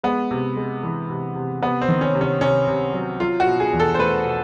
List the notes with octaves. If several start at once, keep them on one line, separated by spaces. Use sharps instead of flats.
G#3 B3
C3
G#3
E3
C3
C3
C3 B3
C4
D#3
C#4
C3
C#4
C3 C#4
C3
F#3
F#3 F4
F#4
B2
G#4
E2
A4
C5
A3 B4
B2